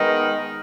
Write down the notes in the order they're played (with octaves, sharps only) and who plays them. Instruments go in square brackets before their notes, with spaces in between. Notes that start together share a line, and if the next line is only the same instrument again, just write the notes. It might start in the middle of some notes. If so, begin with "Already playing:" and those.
Already playing: [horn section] D#3 G#3 B3 D#4